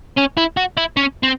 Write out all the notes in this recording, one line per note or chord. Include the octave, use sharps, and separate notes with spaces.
C#4
E4
F#4
E4
C#4
C4